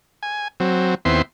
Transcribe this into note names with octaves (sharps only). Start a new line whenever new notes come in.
G#5
F#3 C4
D#2 B3 C4 E4 C6